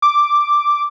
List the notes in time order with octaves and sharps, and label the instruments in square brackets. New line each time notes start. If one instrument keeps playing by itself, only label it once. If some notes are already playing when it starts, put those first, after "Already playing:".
[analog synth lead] D6